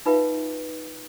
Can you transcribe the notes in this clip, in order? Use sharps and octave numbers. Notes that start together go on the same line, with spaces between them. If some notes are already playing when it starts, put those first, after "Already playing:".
D#4 F4 B4 E5 F5 G5